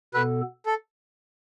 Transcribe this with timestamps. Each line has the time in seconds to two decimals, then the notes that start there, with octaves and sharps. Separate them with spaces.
0.14 B2 B3 A4 B4
0.66 A4